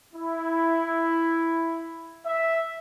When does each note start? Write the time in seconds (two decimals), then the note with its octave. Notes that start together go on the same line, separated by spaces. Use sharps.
0.14 E4
2.25 E5